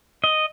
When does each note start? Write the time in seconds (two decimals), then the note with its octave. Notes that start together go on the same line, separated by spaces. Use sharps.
0.24 D#5